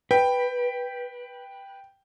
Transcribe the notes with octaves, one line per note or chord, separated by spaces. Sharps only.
B4 G5